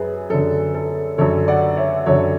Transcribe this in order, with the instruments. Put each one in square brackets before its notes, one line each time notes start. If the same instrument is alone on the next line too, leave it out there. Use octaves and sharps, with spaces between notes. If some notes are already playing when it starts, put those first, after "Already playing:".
Already playing: [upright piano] F#2 G#4 B4
F#2 D3 A4
A4
F#2 D3 A4 C#5
D5 F#5
C#5 E5
F#2 D3 A4 C#5